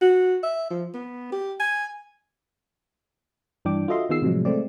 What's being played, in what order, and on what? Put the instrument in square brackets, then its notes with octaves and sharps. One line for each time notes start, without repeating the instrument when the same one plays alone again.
[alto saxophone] F#4
E5
F3
B3
G4
G#5
[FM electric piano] G2 E3 D4 G5 D6
F4 F#4 A4 D#5 E5 C6
D#3 B3 F4 G#4 E6 C7
A2 C3 F3 F#3 G#3
G#3 A3 C4 D5